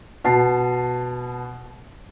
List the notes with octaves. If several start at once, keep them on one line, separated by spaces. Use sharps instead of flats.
B2 A5 C7